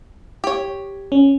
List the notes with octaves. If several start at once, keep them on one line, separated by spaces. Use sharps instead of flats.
G4 C#5
C#4